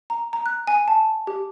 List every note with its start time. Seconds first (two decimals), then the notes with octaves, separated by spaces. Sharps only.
0.10 A#5
0.33 A#5
0.46 F#6
0.67 G#5
0.88 A5
1.27 G4